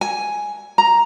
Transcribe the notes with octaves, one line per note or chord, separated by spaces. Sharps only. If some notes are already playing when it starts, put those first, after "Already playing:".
G#5
A#5